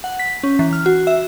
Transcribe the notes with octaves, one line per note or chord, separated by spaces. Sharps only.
F#5
B6
C#4
E3
F6
F#4
E5